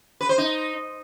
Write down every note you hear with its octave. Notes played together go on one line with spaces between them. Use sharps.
B4
C5
D#4